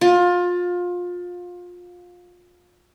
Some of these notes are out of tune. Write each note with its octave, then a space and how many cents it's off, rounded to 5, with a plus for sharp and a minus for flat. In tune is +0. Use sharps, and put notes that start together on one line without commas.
F4 +25